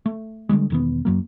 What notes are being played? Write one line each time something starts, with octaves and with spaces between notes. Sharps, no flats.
A3
D3 E3 G3 G#3
E1 D#3 B3
F#2 F#3 A#3